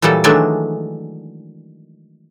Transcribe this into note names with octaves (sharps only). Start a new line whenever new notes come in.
A#2 E3 F#3 G3 A4
D#3 E3 F#3 G#3 A3 D4